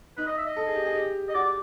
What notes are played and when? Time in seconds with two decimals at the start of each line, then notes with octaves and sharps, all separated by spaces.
0.17 D#4 B4
0.27 D#5
0.38 E5
0.46 D#5
0.56 A4
0.66 G#4
0.75 G4
0.85 G#4
0.95 G4
1.29 D#5
1.34 F#4 D5